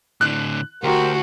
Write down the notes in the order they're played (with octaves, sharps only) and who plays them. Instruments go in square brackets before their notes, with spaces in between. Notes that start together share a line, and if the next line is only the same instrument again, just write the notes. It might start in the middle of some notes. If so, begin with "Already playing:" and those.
[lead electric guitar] A2 D3 [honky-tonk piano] F#6
[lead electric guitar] D2 [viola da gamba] F#4 [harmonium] G4 A#4 C5